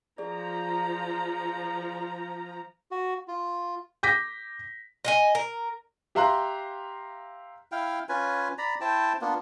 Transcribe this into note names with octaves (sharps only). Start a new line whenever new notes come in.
F3 G#4 D5 A#5
F#4
F4
D6 G6 A#6 B6
D#5 F#5 G#5
A#4
G4 E5 F5 A#5 C6 F#6
E4 F5 G5
C#4 F4 B4 G#5
D5 A#5 B5
E4 C5 G5 A5
A#3 B3 D4 F4